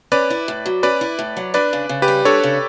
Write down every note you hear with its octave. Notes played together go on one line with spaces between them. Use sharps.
C#4 B4 D5
E4
A2
F#3
C#4 B4 D5
E4
A2
F#3
D4 B4 D5
C#3
C#3
G4 B4
G3
D4 A4 C#5
C#3